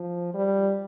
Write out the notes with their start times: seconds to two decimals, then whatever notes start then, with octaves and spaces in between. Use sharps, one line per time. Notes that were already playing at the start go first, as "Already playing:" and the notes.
Already playing: F3
0.34 G3